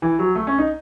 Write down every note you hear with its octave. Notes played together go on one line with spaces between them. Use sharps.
E3
F#3
A3
C#4
D#4